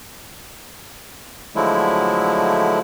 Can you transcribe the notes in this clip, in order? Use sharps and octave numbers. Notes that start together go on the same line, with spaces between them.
D3 F3 F#3 G#3 A3 E4